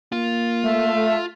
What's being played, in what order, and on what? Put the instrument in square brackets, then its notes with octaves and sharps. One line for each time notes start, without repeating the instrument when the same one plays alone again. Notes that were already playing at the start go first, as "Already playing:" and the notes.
[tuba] A#3 [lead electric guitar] F4
[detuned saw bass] A3 [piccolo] E5